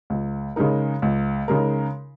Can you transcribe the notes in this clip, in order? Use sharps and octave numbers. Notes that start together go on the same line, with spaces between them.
C#2
C#3 G#3 D#4 A#4
C#2
C#3 G#3 D#4 A#4